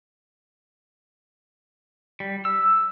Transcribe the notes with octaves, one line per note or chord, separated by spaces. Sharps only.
G3
E6